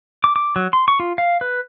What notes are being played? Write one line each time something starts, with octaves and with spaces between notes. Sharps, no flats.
D6
D6
F#3
C6
C#6
F4
F5
B4